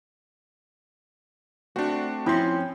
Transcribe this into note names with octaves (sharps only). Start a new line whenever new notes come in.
A3 C4 D4 F#4
F3 C4 C#4 E4 G5 C6